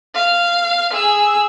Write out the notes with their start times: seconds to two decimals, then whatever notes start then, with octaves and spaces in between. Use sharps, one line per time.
0.15 F5
0.93 G#4 E6